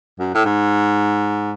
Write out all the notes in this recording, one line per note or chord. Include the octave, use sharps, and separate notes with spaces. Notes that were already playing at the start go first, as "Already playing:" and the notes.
F#2
A2
G#2